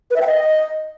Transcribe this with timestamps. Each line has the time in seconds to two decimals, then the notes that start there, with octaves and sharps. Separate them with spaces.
0.11 B4
0.16 E5
0.21 G5
0.27 D#5